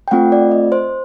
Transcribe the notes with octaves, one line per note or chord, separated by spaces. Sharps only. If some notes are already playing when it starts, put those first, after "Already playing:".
G5
A3 C4 F4 F#5
D5
D#5
C5